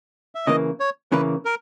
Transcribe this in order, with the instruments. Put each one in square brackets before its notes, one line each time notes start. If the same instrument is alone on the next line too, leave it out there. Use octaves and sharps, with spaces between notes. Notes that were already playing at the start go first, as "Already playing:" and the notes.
[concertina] E5
[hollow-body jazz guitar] C#3 E3 A#3 [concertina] D#5
[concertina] C#5
[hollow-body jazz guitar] C#3 E3 A#3 [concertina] B4
[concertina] A#4